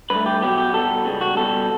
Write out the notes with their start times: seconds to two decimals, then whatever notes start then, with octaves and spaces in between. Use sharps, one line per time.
0.10 G2 D3 A3 B4
0.26 G4
0.42 B2 F#3 B3 G4
0.58 G4
0.73 B2 G3 B3 A4
1.05 C#2 C#3 G3
1.21 F#4
1.36 C#2 B2 G3 B3 A4